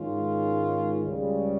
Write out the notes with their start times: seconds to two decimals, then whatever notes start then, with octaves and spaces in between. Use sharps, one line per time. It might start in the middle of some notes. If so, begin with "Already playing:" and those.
Already playing: G#2 D#3 G#3 C#4 F4
1.04 C#2 C#3 G3